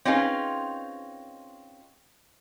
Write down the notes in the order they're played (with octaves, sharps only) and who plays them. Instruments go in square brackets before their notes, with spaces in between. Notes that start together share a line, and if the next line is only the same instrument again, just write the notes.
[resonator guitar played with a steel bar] C4 C#4 D#4 F4 G#4 B4